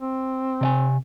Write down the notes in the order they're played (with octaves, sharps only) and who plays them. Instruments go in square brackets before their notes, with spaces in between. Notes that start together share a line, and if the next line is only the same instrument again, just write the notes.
[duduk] C4
[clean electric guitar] C3 D5 G#5